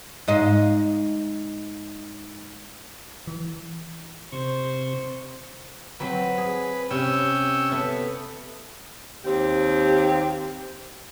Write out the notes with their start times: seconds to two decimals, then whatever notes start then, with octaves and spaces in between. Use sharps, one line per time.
0.28 G#2 D#5 F5
3.27 E3
4.32 C3 C5 C#6
6.00 F#3 C4 B4
6.38 G#4
6.91 C3 C#4 G5 E6
7.72 B3 A4 E5
9.25 D#2 C4 G4